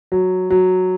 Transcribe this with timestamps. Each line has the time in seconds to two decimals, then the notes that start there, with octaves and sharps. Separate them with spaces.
0.12 F#3
0.50 F#3